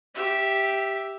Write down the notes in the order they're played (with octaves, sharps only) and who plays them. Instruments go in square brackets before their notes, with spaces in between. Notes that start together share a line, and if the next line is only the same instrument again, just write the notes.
[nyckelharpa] G4 E5